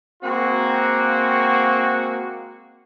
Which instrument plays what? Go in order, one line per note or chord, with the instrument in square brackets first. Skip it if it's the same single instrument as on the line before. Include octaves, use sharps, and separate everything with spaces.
[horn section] G#3 A#3 C4 F#4